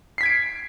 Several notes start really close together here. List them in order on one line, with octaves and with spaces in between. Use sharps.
C7 B6 G#6 D7